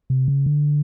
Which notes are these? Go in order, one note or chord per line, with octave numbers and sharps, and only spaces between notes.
C3
C#3
D3